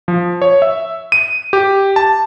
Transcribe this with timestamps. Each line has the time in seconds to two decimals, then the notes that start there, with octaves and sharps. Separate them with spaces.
0.08 F3
0.42 C#5
0.62 E5
1.12 D#7
1.53 G4
1.96 A5